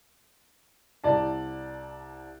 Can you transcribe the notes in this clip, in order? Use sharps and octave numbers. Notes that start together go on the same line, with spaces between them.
C2 D5 A5